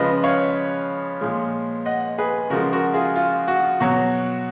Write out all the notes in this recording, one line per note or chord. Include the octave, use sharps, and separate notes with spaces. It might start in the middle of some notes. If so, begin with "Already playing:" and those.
Already playing: C#3 F3 G#3 B4 D#5
C#5 F5
A#2 F3 G#3
D#5 F#5
G#4 B4
C#3 F3 G#3 F#4 A#4
F#4 A#4
F4 G#4
F4
F#4
B2 F#3 F#4